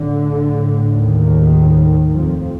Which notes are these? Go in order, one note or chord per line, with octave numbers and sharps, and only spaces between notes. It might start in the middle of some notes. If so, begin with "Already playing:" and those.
Already playing: A2 D3
D#2 D#3
F2 A2 F3